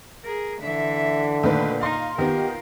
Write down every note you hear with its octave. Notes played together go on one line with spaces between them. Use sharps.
G#4 A#4
D3 E3 E5
A#2 D#3 A3 B4
D#4 F5 C6
D#3 B3 F4 G4 A#4